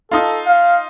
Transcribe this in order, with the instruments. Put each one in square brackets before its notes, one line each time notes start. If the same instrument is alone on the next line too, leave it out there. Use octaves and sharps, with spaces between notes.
[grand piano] D#4 F4 [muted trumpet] A4
[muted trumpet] F5